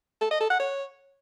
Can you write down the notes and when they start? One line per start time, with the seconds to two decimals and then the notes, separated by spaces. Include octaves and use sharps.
0.21 A4
0.31 D#5
0.40 A4
0.50 F#5
0.60 C#5